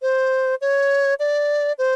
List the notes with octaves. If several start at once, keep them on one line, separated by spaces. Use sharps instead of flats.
C5
C#5
D5
C5